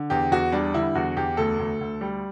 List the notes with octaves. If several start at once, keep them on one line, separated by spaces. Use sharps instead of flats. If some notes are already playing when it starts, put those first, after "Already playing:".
Already playing: D3
E2 G4
E2 F#4
G3 D4
D3 E4
E2 F#4
E2 G4
D2 A4
D2
D2
G3